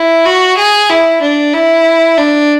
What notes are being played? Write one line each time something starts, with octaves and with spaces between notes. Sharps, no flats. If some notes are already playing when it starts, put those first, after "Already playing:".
Already playing: E4
F#4
G#4
E4
D4
E4
D4